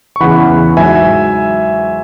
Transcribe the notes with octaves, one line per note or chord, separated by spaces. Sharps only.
C#6
E2 C#3 E3 F#5 B5
G#2 F#3 E5 G#5